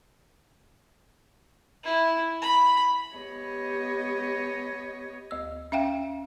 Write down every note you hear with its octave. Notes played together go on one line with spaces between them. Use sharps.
E4
B5
B3 G4 C#5 D#5
D2 E6
C#4 E5 F5 G5